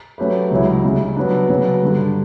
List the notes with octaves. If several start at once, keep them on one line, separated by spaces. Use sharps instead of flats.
F#3 A3 C#4 G4 B4
C#2 C#3 F#3 C#4 E4
C#2 C#3 G3
F#3 B3 D4
C#3 F#3 B3 D4
G2 D3 G3 D4